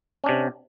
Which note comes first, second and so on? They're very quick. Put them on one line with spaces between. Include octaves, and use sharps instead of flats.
C#4 D4 C3